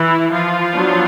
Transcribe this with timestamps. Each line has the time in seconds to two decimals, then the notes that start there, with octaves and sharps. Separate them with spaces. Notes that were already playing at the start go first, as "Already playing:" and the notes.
Already playing: E3 E4
0.32 F3 F4
0.73 F#3 B3 D4